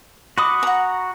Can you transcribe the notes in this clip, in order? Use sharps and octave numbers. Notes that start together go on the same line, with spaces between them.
F#4 D#5 B5 D6 D#6
F#5 A#5